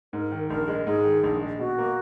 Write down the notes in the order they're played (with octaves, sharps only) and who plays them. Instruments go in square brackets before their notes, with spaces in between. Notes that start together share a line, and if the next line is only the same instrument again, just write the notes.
[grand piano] G#2 [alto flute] A#4
[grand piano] D#3
[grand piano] A#1 [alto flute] A#4
[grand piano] G#3
[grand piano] G#2 [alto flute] G#4
[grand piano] D#3
A#1
G#3
[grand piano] B2 [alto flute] F#4
[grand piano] A#3